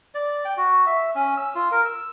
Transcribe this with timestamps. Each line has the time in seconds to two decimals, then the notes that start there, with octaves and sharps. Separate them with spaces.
0.14 D5
0.45 G5
0.57 F#4
0.86 E5
1.15 C#4
1.37 E6
1.55 F4
1.71 A#4
1.85 E6